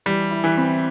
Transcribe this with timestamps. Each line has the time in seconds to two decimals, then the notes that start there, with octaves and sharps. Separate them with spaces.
0.06 E3 G3
0.31 E4
0.44 E3
0.57 C4